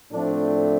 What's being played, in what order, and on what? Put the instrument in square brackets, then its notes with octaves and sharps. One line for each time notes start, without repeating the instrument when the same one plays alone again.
[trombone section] A2 F3 A3 C4 D4